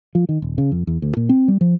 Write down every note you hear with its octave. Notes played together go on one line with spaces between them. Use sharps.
F3
D#3
D#1
C#3
F2
E2
D2
A#2
C4
G3
F3